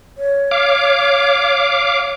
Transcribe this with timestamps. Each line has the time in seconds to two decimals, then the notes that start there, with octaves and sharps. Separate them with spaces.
0.18 C#5
0.51 F5 D6